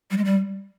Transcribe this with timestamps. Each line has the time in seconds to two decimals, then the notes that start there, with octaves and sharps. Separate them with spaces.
0.11 G3
0.17 G#3
0.25 G3